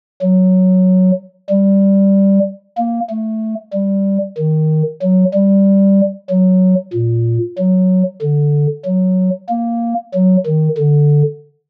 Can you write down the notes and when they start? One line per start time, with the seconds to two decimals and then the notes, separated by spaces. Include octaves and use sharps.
0.21 F#3
1.50 G3
2.77 A#3
3.10 A3
3.73 G3
4.37 D#3
5.02 F#3
5.34 G3
6.29 F#3
6.93 A#2
7.58 F#3
8.22 D3
8.85 F#3
9.49 A#3
10.14 F#3
10.46 D#3
10.78 D3